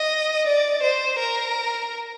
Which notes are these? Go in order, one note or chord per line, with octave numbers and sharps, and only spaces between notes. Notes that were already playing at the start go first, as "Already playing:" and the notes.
Already playing: D#5
D5
C5
A#4